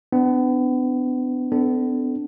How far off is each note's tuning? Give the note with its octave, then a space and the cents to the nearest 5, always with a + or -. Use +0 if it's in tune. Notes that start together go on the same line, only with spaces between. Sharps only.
B3 +35 D4 +5
B3 +40 D4 +0 A4 +0